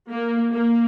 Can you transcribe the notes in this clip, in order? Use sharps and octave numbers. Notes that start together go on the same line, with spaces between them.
A#3
A#3